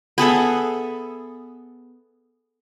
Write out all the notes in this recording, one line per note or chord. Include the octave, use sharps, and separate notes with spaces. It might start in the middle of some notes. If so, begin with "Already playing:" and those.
B3 G#4 A4 E5